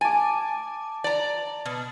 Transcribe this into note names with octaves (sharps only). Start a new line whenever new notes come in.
G#5 A5 D6
D5 A#5
B2